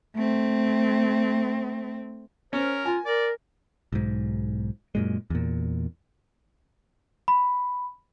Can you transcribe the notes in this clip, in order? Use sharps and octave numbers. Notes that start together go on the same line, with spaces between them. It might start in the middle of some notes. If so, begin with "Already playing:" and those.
A3 C4
C#4 A#4 C5
F4 G#5
A#4 D5
B1 G#2
F#2 A#2 G#3
E2 A#2
B5